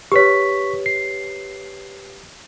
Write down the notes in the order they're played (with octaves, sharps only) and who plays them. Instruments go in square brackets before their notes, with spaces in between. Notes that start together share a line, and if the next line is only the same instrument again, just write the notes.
[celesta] G4 B4 C#5 [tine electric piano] C#6 B6
[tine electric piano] C7